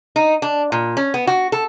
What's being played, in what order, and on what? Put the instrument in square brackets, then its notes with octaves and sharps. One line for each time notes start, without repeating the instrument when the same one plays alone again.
[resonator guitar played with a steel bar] D#4
D4
A#2
C#4
B3
F#4
A4